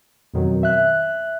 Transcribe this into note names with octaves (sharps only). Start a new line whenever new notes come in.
F2 B2 D#3 F#3
E5 F#6